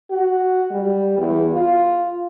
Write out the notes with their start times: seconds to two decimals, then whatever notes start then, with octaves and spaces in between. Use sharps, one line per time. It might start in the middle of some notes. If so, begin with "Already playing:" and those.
0.11 F#4
0.72 G3
1.18 E2
1.54 F4